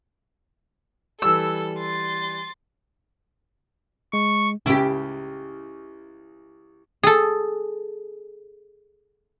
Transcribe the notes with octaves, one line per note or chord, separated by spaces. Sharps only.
E3 G3 A4 E6
C6 A6
G#3 C#6
C#2 C#3 E4 G4
G#4 A4